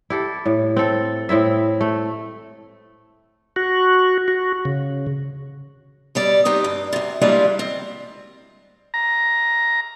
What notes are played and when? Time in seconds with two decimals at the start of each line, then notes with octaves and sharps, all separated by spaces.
0.10 E4 G4 A4
0.46 A2
0.76 C4 A4
1.29 A2 C4 E4 E5
1.81 A3
3.56 F#4
4.28 F#4
4.65 C#3
6.15 B2 G3 D5
6.45 B3 C4 D#4 G4
6.64 G2
6.93 D2 C3
7.21 G3 G#3 A#3 D4 E4 F4
7.59 C4
8.94 A#5